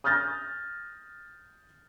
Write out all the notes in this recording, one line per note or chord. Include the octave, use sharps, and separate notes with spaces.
D#6 F6 G6 A6 A#6